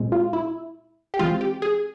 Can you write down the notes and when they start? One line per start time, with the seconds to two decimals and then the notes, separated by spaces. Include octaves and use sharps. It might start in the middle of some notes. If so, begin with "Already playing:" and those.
Already playing: A#2 G#3 C4
0.12 F4
0.33 E4
1.14 G4
1.19 E3 G#3 C4 F4
1.41 G4
1.62 G#4